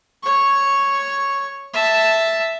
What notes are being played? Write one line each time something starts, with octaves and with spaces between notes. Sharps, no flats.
C#5 C#6
E5 A5